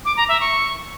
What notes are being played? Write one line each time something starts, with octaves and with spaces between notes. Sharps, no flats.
D6
A#5
E5
C#6